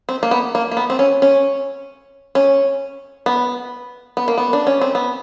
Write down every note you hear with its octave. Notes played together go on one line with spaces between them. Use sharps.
C4
A#3
B3
A#3
A#3
B3
C4
C#4
C#4
C#4
B3
B3
A#3
B3
D4
C#4
C4
B3